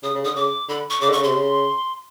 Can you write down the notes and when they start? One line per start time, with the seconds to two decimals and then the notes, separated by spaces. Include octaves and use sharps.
0.03 C#3 D#6
0.15 C#3
0.25 D3 D#6
0.35 C#3 D6
0.69 D3 B5
0.90 C#6
1.01 C#3 D6
1.09 D3
1.12 C#6
1.17 C#3
1.23 C3 C6
1.34 C#3